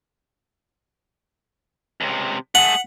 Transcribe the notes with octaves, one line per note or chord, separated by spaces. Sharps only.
C#2 C3
A3 G#4 F#5